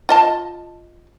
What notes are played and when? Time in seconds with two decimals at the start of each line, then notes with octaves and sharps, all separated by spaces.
0.09 F4 D#5 A5